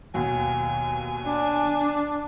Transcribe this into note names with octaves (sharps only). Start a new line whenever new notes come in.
D#2 B2 F#3 G#5
D4